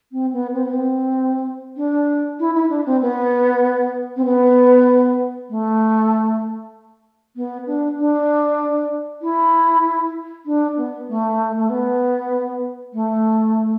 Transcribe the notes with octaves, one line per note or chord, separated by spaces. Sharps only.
C4
B3
C4
B3
C4
D4
E4
E4
D4
C4
B3
C4
B3
A3
B3
D4
D4
E4
D4
B3
A3
A3
B3
A3